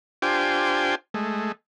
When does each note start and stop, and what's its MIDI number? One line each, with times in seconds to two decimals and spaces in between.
0.22 0.95 62
0.22 0.95 65
0.22 0.95 67
0.22 0.95 72
0.22 0.95 79
0.22 0.95 80
1.14 1.52 56
1.14 1.52 57